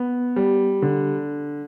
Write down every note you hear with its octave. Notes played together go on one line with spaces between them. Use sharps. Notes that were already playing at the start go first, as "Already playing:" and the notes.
Already playing: B3
G3
D3